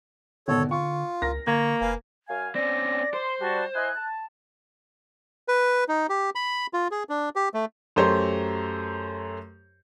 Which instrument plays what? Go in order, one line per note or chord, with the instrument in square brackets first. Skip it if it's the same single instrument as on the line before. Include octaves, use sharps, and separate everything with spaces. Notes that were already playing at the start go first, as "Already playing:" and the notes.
[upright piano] G#1 B2 [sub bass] D3 [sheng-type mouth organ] A4 C#5
[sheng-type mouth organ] F4 [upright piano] C#6
[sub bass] C#2 [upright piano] A#4 A#6
[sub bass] D3 [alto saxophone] A#3 [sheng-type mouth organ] C#6 [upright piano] G#6
[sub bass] F1 [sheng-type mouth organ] B4 F5 G#5
[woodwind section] F#2 F5 G#5
[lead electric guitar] C4 C#4 [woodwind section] D5 [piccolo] A#6
[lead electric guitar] C5 [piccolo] C6
[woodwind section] G3 F#4 [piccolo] A5
[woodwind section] E4 D#5 G#5 [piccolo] F#6
[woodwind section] A5
[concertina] B4
D#4
G4
B5
F4
G#4
D4
G4
A3
[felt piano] F#2 A3 G4 C5 C#5 A#5